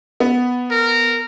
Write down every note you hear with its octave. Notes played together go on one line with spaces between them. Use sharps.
B3
A#4